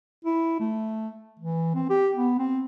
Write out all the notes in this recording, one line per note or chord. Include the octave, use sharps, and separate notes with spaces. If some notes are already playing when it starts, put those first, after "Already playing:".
E4
A3
E3
C4
G4
B3
C4